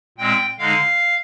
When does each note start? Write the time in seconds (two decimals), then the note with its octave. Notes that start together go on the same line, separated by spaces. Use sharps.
0.18 A#2 G#3 C4 G5
0.59 D3 G#3 D#4 F5